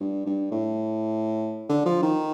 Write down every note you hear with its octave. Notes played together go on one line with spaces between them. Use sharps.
G2
G2
A2
D3
F3
D#3